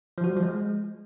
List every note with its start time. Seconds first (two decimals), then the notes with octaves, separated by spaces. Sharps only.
0.18 F3
0.24 F#4
0.30 G3
0.36 F3
0.43 G#3